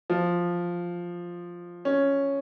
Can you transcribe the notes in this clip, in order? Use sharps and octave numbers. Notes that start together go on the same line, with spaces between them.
F3
C#4